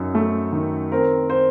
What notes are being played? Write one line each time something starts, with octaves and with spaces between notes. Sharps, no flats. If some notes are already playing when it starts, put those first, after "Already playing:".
Already playing: F#2 D#4
A3
D#3
C4 A#4
C5